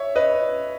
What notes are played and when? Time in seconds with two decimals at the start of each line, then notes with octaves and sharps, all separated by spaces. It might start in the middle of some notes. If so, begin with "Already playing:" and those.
Already playing: C#5 E5
0.15 B4 D#5